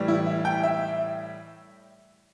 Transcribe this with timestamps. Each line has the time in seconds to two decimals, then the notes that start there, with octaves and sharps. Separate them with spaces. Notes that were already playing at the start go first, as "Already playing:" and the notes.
Already playing: A2 E3 G3
0.08 E4
0.26 E5
0.45 G5
0.64 E5